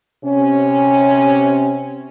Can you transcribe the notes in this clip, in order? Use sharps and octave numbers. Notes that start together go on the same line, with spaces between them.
C3 C#4